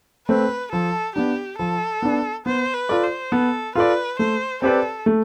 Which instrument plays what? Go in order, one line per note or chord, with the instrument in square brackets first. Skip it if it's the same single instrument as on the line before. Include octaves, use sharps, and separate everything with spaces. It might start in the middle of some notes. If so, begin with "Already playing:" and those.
[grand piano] A3 C4 [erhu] B4
[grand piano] F3 [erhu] A4
[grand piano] B3 D4 [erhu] G4
[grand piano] F3 [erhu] A4
[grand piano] B3 D4
[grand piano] B3 [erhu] C5
[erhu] B4
[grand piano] F4 A4 D5
[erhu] C5
[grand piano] B3 [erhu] A4
[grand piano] F4 A4 D5 [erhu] B4
[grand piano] A3 [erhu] C5
[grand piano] C4 G4 B4 D5 [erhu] A4
[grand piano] A3